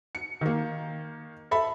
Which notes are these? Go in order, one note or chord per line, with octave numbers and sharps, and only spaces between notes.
C#7
D#3 A#3
A4 E5 B5